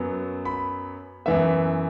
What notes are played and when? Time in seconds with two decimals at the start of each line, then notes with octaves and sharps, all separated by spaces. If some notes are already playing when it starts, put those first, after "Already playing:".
Already playing: F#2 F#3 B3
0.45 B5
1.26 F#2 E3 B3 E5